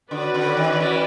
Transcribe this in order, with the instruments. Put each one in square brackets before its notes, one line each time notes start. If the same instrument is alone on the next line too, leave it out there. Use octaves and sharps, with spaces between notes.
[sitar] D3 [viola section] C#4 F#4 B4 D5
[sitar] D3
D#3
E3